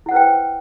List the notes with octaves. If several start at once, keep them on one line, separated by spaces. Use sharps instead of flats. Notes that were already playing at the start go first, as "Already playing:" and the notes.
E4 B4 C5 F#5 G5